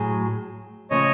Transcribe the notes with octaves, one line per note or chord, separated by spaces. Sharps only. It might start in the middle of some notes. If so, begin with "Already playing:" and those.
Already playing: A2 F#3 G#4
C#3 F3 A3 C#5 D#5